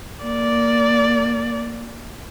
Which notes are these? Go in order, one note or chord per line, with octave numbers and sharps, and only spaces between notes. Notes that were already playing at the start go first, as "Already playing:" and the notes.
A#3 D5